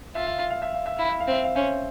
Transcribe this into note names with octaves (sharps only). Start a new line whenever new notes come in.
F4 E5
F5
E5
F5
E5
F5
E5
E4 F5
E5
F5
C4
E5
F5
C#4 C5 E5